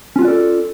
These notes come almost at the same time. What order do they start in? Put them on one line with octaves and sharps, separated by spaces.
C#4 F4 F#4 D5 A4